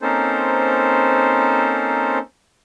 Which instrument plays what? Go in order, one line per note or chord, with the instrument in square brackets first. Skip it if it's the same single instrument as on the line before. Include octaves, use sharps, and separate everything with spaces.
[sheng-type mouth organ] A#3 C4 C#4 D#4 A4 C5